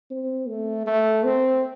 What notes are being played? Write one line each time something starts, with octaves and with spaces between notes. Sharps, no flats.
C4
A3
A3
C4